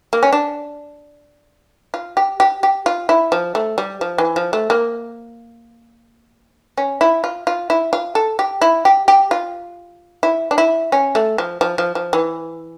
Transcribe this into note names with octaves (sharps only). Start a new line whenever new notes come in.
A#3
C#4
D4
F4
G4
G4
G4
F4
E4
F3
A3
G3
F3
E3
F3
A3
A#3
C#4
E4
F4
F4
E4
F4
A4
G4
E4
G4
G4
F4
E4
D4
E4
C#4
A3
F3
F3
F3
F3
E3